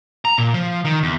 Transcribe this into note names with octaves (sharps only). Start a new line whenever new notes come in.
A#5
A#2
F3
D#3
E2